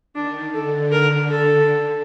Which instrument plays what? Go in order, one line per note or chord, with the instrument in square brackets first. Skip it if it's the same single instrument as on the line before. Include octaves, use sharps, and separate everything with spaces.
[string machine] D#3 [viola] D4
[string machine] D3 [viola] A4
[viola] A#4
A4